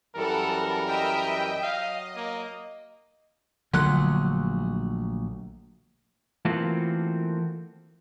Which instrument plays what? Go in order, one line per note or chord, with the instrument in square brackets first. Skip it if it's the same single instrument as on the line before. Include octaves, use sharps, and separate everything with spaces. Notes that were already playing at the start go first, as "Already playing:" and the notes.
[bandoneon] F#2 E3 G3 [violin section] A4 F#5 [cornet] A#4
[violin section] D#5 E5 G5
[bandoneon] F#3 [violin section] D#5 [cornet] F5
[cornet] A#3
[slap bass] A#1 F#3 A3 [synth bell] D3 F#6
[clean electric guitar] E3 A3 A#3 C4 F4 F#4